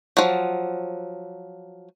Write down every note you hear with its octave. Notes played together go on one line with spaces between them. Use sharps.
F3 F#3